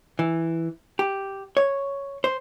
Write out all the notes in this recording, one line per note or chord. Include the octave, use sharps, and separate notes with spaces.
E3
G4
C#5
C5